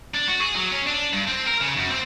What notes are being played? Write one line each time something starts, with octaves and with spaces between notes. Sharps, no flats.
D4
F#4
G#4
F#3
C#4
D4
G2
C4
A#4
C#3
F#2
C4